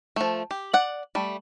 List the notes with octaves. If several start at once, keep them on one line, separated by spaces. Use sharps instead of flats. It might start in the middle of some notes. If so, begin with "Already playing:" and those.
F3 A3
G4
D5 F#5
G3 A3